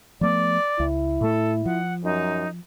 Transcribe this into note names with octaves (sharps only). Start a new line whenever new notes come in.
F3 A3 B3 D5
C#2 E4
A2 A3 A4
F3 F#5
F#2 D#4